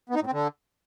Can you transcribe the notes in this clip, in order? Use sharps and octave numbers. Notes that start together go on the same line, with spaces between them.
B3
D#4
A2
C4
D3